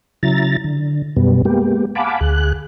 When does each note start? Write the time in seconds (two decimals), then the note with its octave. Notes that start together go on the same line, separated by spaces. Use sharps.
0.23 C#3 F#3 E4 A#5 A6
0.64 D3
1.16 F#2 B2 G3 B3
1.45 G#3 A#3 B3 G4
1.95 F5 F#5 G#5 A5 B5 D6
2.21 D2 G#4 F#6